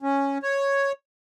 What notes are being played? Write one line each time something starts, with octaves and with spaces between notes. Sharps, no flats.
C#4
C#5